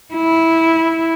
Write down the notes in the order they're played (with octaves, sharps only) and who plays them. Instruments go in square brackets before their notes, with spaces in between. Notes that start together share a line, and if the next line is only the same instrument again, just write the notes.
[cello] E4